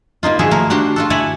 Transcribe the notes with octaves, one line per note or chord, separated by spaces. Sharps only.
G3 A#3 D#4 F4
F3 F#4 G#4 A#4 E5
F3 A3 A#3 A#4
D4 F#4 G4 C5
F4 F#4 A4
E4 C#5 D5 E5 F#5 G#5